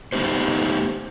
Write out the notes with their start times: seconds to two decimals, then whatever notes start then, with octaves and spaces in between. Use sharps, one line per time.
0.12 A3 B3 D#4 G4 C5